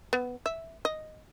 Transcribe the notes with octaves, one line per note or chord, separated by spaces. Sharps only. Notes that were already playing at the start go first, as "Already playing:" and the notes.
B3
E5
D#5